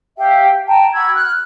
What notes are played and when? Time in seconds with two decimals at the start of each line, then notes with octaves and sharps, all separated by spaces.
0.17 G4 E5 F5 G5
0.67 G5 A5 A#5
0.92 F#4 B5 E6 G#6
1.15 F6 F#6